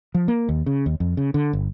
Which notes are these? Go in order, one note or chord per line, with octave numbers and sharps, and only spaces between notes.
F3
A#3
D#2
C#3
D#2
F2
C#3
D3
G1